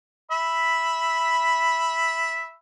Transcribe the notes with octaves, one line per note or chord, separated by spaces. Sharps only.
E5 B5